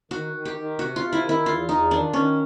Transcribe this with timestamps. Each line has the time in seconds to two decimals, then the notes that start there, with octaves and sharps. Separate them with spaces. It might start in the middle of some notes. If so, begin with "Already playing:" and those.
0.11 D#3 F#4
0.33 D#3
0.45 G4
0.57 D#3
0.79 C3 F#4
0.96 F4
1.02 C3
1.13 E4
1.24 D#3
1.29 E4
1.46 E2 F4
1.69 E2 D#4
1.91 D#3 D4
2.13 D#3 C#4